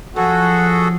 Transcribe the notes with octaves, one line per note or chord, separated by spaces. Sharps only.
F3 F#3 F#4 G#4 A4 F#5